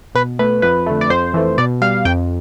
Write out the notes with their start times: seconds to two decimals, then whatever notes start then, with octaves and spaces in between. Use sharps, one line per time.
0.15 B2 B4
0.39 A3 B4
0.62 F2 B4
0.86 D3 A3
1.01 D5
1.10 F2 C5
1.34 E3 A3
1.58 B2 D5
1.82 G3 F5
2.05 F2 G5